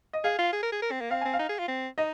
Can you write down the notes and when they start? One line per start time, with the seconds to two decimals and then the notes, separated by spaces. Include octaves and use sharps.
0.13 D#5
0.24 G#4 F5
0.38 F4
0.53 G#4
0.63 A#4
0.72 G#4
0.82 A#4
0.91 C4
1.01 A#3
1.11 C4 F5
1.21 C4 G#5
1.33 F5
1.39 D#4
1.49 G#4
1.59 F4
1.68 C4
1.98 D#4 D#5